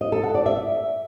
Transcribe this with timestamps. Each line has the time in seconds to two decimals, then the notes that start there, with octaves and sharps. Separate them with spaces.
0.01 D#5
0.12 A4
0.23 F#5
0.35 D5
0.46 E5